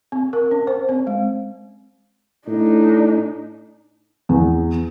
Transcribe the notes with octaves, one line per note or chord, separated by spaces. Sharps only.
C4
A#4
C#4
C5
C4
G#3
A2 D4 D#4
E2